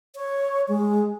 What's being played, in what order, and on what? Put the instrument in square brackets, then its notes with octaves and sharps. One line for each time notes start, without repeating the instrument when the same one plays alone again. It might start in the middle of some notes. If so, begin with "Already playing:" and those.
[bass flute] C#5
G#3